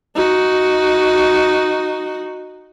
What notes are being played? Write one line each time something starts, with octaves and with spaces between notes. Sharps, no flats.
D#4 F#4